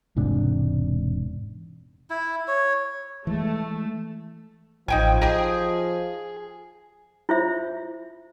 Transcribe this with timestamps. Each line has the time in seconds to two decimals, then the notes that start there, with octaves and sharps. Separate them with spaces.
0.16 E1 G#2 C3 D4
2.10 E4
2.48 C#5
3.27 E3 G#3 A3
4.88 A1 F3 D#4 G5 G#5
5.22 D#4 G4 G#4
7.29 E4 F4 C5 C#5 E5